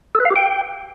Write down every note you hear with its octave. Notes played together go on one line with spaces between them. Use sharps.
A4
B4
F5
G4
G5